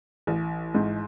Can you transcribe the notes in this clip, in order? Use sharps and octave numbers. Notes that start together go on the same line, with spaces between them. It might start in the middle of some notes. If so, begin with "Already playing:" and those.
A1
G#2